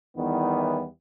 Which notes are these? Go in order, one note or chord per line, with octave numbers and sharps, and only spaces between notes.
E2 D#3 E3 G3 B3